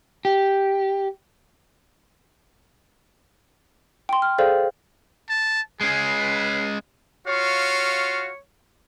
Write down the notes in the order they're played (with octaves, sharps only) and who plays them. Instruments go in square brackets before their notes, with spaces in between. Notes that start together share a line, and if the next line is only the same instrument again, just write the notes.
[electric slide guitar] G4
[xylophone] G5 C6
F6
G#4 A4 C5 D5 F5 G5
[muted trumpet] A5
[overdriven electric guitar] G#3 C#4 [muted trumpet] G#4 [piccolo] C7
[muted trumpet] B4
[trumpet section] F4 F#4 F5 [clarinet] C#5